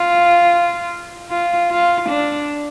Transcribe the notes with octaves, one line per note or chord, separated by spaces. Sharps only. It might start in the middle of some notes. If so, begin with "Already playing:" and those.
Already playing: F4
F4
F4
D4